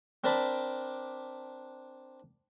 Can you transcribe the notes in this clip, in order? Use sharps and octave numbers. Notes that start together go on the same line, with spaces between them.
C4 D4 A#4 D5 B5